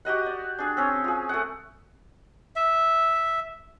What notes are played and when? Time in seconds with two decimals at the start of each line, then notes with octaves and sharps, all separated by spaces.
0.05 F#4 G4 D#5 F#5
0.26 D5
0.59 D4 G#4
0.77 C4 C#4
1.04 F4 G#4
1.29 A3 F#5
2.56 E5